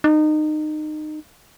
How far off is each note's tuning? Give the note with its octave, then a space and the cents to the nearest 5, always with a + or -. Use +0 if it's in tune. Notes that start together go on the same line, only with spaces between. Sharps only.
D#4 -25